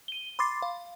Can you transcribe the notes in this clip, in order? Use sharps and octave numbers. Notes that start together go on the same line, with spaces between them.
D#7 G7
B5 C6 D6 A6 C7
F5